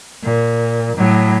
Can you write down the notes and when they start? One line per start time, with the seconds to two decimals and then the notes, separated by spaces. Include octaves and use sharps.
0.24 A#2
0.97 A2 F#3